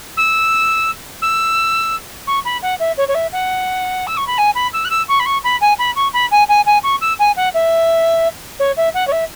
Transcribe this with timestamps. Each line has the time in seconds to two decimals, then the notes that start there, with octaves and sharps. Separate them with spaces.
0.17 E6
1.22 E6
2.27 C#6
2.45 B5
2.62 F#5
2.79 E5
2.97 C#5
3.08 C#5
3.14 E5
3.32 F#5
4.07 E6
4.17 C#6
4.27 B5
4.38 G#5
4.55 B5
4.73 E6
4.85 F#6
4.90 E6
5.08 C#6
5.19 B5
5.25 C#6
5.44 B5
5.61 G#5
5.78 B5
5.95 C#6
6.13 B5
6.31 G#5
6.48 G#5
6.66 G#5
6.83 C#6
7.01 E6
7.19 G#5
7.36 F#5
7.54 E5
8.59 C#5
8.76 E5
8.94 F#5
9.07 C#5
9.12 E5